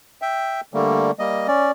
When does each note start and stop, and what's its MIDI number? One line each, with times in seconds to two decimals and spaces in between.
0.22 0.61 76
0.22 0.61 79
0.74 1.11 50
0.74 1.11 55
0.74 1.11 57
0.74 1.11 58
1.19 1.47 55
1.19 1.47 58
1.19 1.47 75
1.48 1.71 61
1.48 1.71 74